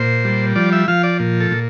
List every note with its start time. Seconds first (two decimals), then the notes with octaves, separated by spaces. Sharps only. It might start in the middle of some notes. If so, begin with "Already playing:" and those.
Already playing: A#2 C5
0.25 G3
0.55 F3 D5
0.73 E5
0.88 F3 F5
1.03 D5
1.20 A#2
1.40 A4
1.51 A#2